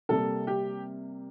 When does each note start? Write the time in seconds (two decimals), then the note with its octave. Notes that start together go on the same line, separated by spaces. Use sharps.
0.09 C3 G3 A#3 A4
0.47 G4